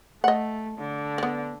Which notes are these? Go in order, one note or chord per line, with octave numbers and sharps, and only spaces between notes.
A3 D#5 F#5
D3
B3 D4